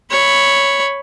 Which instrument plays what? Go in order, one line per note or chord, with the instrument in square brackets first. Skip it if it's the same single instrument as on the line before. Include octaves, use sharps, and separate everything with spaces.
[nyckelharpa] C#5 B5